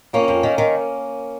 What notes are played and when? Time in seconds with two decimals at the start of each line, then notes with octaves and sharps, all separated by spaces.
0.13 F2 A#3 C#4
0.28 F2
0.43 D#3
0.58 D#3